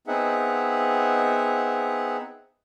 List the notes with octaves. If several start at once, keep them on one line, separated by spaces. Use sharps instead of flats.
B3 C4 D#4 G#4 E5 F#5